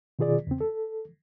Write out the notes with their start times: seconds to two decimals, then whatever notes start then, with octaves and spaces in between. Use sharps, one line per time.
0.19 B2 D#3 F4 G#4 D5
0.47 E2 C#3 C4
0.61 A4